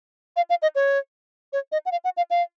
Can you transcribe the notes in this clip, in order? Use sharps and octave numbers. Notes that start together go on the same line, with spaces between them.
F5
F5
D#5
C#5
C#5
D#5
F#5
F5
F#5
F5
F5